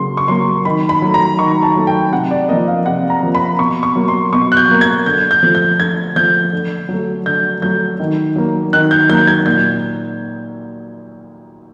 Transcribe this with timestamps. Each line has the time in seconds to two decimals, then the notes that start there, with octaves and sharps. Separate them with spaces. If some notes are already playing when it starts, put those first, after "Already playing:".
Already playing: C#3 F#3 A#3 C6
0.17 C#6
0.28 F#3 A#3 C6
0.65 D#3 B5
0.89 B5
1.02 F#3 A3
1.14 A#5
1.38 D#3 C#6
1.63 A5
1.76 F#3 A3
1.87 G5
2.12 C3 F#5
2.31 D5
2.49 F3 A#3 D#5
2.68 F5
2.86 C3 F#5
3.10 A#5
3.23 F3 A#3
3.35 B5
3.58 B2 C#6
3.83 C#6
3.96 F#3 A#3
4.08 C6
4.32 B2 C#6
4.52 F#6
4.57 G6
4.69 F#3 A#3
4.81 G#6
5.06 D3 G6
5.31 G6
5.43 F3 A3
5.55 G6
5.79 D3 G#6
6.16 F3 A3 G6
6.52 D3
6.89 F#3
6.94 A3
7.26 D3 G6
7.62 F#3 A3 G6
8.00 D#3
8.36 F#3 A#3
8.73 D#3 F#6
8.91 G6
9.09 F#3 A#3 G6
9.27 G#6
9.46 A#2 G6